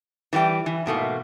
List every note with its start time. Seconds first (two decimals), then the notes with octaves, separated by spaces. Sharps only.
0.33 E3 G3 D#4 G5
0.66 E3
0.86 G#2 B2 A3 A#3